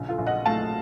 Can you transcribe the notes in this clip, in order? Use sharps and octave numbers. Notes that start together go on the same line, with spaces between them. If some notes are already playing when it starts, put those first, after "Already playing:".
Already playing: A#1 C#3
F4 A4
A#1
D#5 F#5
A3 F5 A5